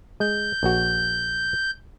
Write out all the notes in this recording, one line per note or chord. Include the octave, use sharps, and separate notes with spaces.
G#3 G6
A#1 F#4